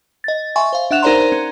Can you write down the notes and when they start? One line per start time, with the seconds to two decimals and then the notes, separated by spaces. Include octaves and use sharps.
0.24 D#5 A6
0.56 E5 G#5 C6 C#6
0.73 C5 F5
0.91 D4 E5 F#5 F#6 E7 F7
1.02 D#4 A#4 C5 D5 A#5 C6
1.32 C#4